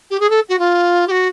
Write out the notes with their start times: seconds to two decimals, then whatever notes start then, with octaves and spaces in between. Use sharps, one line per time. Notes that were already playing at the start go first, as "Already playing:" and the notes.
0.10 G4
0.20 G#4
0.29 A4
0.49 F#4
0.58 F4
1.07 G4
1.10 F#4